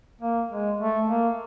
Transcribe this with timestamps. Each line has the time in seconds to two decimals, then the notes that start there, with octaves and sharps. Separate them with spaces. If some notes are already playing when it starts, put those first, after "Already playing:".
0.21 A#3
0.51 G#3
0.80 A3
1.08 A#3